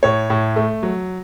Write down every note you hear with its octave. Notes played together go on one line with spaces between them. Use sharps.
A2 C#5
A2
A3
F#3